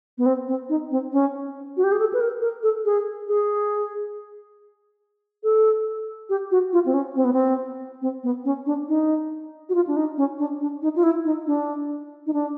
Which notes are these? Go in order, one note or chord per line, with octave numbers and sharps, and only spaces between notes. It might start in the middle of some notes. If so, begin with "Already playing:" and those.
B3
C4
C4
D#4
C4
C#4
F#4
G4
G#4
A4
B4
A#4
A#4
A4
G#4
G#4
A4
G4
F#4
F4
C4
C#4
C4
B3
C4
C4
B3
C#4
D4
D#4
F#4
F4
D4
D#4
C#4
D4
D4
D#4
F4
E4
D#4
D4
D#4
D4